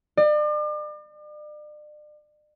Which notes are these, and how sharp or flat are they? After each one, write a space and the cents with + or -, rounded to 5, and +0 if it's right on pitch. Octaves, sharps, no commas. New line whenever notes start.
D5 +40